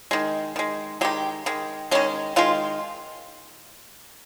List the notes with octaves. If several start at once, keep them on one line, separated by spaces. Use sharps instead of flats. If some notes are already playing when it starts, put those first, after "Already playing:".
D#3 G#3
D#3 G#3
D#3 G#3 G4
D#3 G#3
D#3 G#3 C#4
D#3 G#3 F4